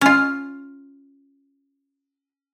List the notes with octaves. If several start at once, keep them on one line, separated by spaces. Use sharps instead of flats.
C#4 F4